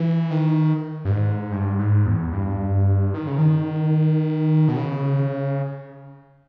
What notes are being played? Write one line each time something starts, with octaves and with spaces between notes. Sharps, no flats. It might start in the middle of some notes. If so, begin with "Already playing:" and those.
Already playing: E3
D#3
G2
G#2
G2
G#2
E2
G2
D#3
C#3
D#3
B2
C#3